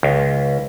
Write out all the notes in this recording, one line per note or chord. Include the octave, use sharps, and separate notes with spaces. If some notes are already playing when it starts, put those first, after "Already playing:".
C#2